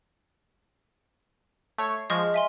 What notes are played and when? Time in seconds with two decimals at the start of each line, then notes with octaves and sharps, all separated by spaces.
1.78 A3 C#5
1.98 C7
2.10 F3 G#3 D#5 C#6 F6
2.34 E5 G#5 C6